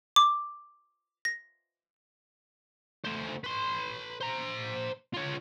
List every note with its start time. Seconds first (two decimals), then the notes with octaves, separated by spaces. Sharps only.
0.16 D6
1.25 A#6
3.04 A3 C5
3.44 B4 C6
4.20 C5 A#5
5.14 F4 C#5